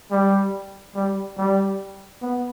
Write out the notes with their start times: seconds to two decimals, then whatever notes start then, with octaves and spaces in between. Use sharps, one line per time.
0.11 G3
0.95 G3
1.37 G3
2.22 B3